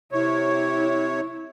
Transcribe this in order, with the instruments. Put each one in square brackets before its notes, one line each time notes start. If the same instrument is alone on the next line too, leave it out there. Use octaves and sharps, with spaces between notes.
[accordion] C3 C#5 [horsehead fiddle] E4